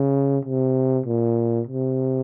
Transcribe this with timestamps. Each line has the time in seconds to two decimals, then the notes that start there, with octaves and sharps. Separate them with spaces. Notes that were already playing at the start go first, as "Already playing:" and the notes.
Already playing: C#3
0.45 C3
1.06 A#2
1.67 C3